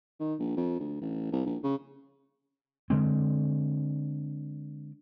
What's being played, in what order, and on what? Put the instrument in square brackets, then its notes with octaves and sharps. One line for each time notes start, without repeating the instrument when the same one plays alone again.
[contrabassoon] D#3
A#1
F2
D2
A1
C2
A#1
C#3
[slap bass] D3 G#3 C4